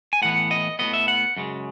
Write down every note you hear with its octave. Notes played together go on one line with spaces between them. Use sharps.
G#5
A2 E3 B3 F#5
D#5
A2 G#3 B3 D#5
E5
F#5
F#2 C#3 G#3